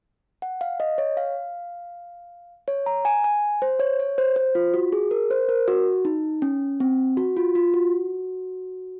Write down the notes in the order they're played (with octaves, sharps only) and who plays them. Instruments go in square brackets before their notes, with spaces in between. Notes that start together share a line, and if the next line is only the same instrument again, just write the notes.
[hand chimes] F#5
F5
D#5
C#5
F5
C#5
A#5
G#5
G#5
C5
C#5
C#5
C5
C5
F4
F#4
G#4
A#4
C5
A#4
F#4
D#4
C#4
C4
F#4
F4
F4
F#4